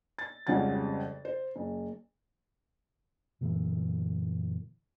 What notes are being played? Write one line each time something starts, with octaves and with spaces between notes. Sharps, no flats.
A6
G#1 F2 C#3 G3 F#5 A6
C5
F#1
F#2 A#2 D3 E3